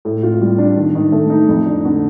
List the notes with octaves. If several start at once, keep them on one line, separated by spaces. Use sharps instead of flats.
A2
F4
G3
D4
D#3
D#3
A3
D#4
F2
D4
D3